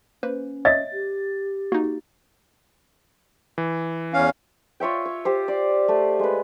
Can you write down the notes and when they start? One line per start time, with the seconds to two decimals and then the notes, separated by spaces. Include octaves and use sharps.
0.23 A#3 C#4 B4 C5
0.65 C#5 D#5 E5 A6
0.93 G4
1.72 A#3 D#4 F#4
3.58 E3
4.14 E2 C#4 F5
4.80 F4 C#5 E5 G5
5.05 C#5
5.25 G4 C5
5.48 D5
5.88 A3
6.19 G#3 B4